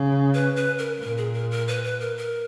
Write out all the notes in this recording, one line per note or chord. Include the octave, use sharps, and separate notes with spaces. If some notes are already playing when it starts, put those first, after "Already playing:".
Already playing: C#3
B4
B4
A#4
A#2 A#4
G#4
A#4
A#4
B4
B4
A#4
A#4